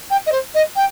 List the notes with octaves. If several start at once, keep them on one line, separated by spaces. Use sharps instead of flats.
G5
D#5
C5
D#5
G5